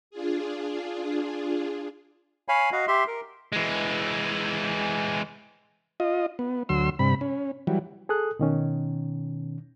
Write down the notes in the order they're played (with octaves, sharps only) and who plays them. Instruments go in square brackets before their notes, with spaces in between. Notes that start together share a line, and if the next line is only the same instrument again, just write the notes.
[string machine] D4 F4 G#4
[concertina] C#5 F5 G#5 B5
F#4 D#5 F5
G4 E5 C6
A#4
[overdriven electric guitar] E3 G#3
[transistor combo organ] F4 D#5
B3
D2 F#3 C6 E6
G2 C3 B5
C#4
E3 F#3 G3
[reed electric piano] G#4 A4 D#6 F#6
B2 D#3 C#4